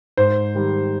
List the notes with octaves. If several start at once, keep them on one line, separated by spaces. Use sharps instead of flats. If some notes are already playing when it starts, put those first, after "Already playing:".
G#2 C5
D#3 G3